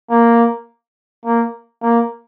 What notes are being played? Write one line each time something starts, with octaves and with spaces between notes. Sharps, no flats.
A#3
A#3
A#3